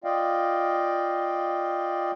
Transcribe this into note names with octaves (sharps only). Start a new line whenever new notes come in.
F4 D5 D#5 F5 G5